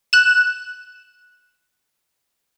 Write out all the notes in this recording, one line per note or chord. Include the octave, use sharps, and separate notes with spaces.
F#6 E7